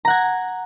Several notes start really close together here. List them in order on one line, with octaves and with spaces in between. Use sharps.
A#5 F#5 G#6